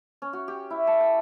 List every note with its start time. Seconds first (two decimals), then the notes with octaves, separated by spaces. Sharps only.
0.22 C#4
0.33 F#4
0.48 G4
0.70 E4
0.87 A5
1.00 G5